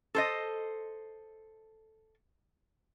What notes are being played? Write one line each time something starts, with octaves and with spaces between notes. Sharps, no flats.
A4 C5 D#5